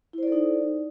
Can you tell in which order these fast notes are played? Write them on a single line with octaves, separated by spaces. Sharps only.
E4 C5 D5 A4 D#4